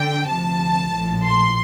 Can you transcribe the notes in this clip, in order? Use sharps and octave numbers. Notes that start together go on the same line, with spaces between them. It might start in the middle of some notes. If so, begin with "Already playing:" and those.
Already playing: D3 G5
D2 C3 F3 A5
A#1 A2 F3
C6